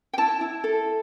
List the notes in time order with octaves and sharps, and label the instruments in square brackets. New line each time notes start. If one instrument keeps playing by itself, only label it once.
[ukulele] G5
E4 A5
E4
A4